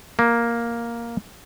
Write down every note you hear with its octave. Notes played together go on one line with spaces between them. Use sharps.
A#3